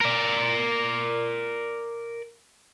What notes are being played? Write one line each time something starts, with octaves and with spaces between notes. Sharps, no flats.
A#4 D5